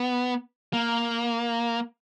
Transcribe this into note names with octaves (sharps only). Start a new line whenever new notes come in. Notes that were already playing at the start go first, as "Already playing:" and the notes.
Already playing: B3
A#3